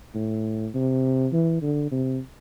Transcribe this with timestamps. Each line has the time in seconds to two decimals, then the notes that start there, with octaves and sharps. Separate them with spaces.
0.14 A2
0.74 C3
1.32 E3
1.62 D3
1.92 C3